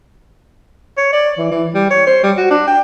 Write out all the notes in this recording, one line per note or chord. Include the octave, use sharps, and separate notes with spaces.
C#5
D5
E3
E3
G3
C#5
C5
G3
F#4
D4
G5